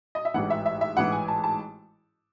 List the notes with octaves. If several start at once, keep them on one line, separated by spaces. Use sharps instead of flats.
D#5
E5
A1 G#2 E3 F#5
E5
E5
E5
A1 G#2 E3 F#5
G#5
A5
A5